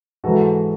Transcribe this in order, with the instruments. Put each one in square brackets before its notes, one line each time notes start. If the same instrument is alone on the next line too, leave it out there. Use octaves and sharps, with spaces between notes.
[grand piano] G#2 E3 F#4 A4